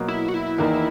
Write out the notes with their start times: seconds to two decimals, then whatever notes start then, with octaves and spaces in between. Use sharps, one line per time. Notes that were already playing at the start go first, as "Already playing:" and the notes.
Already playing: B2 F#3 A#3
0.08 E4
0.29 F#4
0.34 E4
0.58 E2 D#3 A#3 D#4